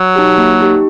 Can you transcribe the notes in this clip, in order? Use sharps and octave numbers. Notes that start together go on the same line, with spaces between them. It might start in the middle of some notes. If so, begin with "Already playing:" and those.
Already playing: F#3
D#4 G4
A#3
D#4 G4